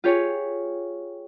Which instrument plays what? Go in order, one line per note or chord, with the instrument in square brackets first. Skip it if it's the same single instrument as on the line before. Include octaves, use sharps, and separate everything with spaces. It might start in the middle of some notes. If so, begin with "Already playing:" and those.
[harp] F4 G4 G#4 C#5